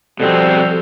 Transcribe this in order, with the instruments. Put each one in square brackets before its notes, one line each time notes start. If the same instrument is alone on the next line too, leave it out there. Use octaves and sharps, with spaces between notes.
[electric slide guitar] B2 C4 [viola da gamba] F3 F#4 [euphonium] G3 [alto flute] A4